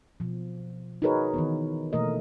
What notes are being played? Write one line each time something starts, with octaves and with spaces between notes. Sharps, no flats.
B2 F3
D#4 F#4 G#4 A#4 B4 C#5
D#3 E3 B3
B2 E3 A3 A#3 A#4 D#5